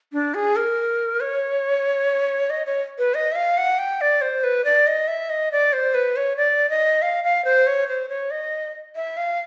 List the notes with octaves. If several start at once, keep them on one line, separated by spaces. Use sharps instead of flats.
D4
G#4
A#4
C#5
D#5
C#5
B4
D#5
E5
F5
F#5
G5
D5
C5
B4
D5
D#5
E5
D#5
D5
C5
B4
C#5
D5
D#5
F5
F5
C5
C#5
C5
C#5
D#5
E5
F5